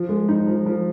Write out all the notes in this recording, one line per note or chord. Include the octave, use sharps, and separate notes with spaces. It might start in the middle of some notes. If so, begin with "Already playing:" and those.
Already playing: F3
G#3
D#4
F3
F3